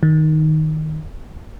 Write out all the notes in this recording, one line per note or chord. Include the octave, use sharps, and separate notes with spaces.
D#3